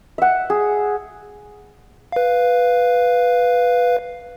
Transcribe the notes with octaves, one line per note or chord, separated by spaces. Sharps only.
E5 F#5
G#4
B4 F5